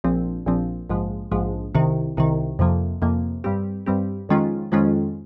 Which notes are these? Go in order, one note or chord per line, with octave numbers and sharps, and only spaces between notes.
A#1 A#2 F3 C4
A#1 A#2 F3 C4
A#1 G#2 F3 G#3
A#1 G#2 F3 G#3
C2 C3 D#3
C2 C3 D#3
F2 C3 F3 A#3
F2 C3 F3 A#3
G2 G3 C4 G4
G2 G3 C4 G4
F2 D#3 G#3 C#4 F4
F2 D#3 G#3 C#4 F4